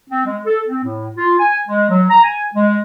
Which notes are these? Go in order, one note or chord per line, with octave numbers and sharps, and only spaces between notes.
C4
G#3
A4
C4
A2
F4
G#5
G#3
F#3
A#5
G#5
G#3